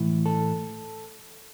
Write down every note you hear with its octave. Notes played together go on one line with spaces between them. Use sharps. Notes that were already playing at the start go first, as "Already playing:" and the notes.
Already playing: A2 E3
A4